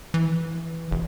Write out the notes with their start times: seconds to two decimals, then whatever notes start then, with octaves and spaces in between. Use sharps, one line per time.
0.14 E3
0.91 F1